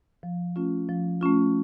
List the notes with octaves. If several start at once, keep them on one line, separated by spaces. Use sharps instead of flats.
F3
A3 C#4 F4
F3
A3 C#4 F4